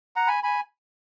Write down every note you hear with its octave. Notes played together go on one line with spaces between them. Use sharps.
F#5 A#5
G#5 B5
G#5 B5